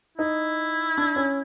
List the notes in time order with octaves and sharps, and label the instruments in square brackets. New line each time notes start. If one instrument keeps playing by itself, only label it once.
[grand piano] D#4 [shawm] E4
[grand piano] D4
C#4